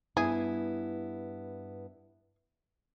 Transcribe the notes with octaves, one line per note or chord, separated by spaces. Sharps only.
G2 B3 E4 G#4